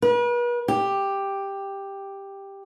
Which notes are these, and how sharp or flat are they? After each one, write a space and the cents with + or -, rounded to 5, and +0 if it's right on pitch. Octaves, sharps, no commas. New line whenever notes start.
B4 -40
G4 +5